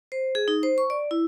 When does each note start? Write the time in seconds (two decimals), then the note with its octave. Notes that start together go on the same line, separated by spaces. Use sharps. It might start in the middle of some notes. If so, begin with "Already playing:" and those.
0.12 C5
0.35 G#4
0.48 D#4
0.63 C5
0.78 C#6
0.90 D5
1.11 E4